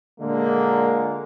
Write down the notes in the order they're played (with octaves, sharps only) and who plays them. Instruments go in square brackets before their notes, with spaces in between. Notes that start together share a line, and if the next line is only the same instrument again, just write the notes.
[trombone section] A#2 D3 G#3 A#3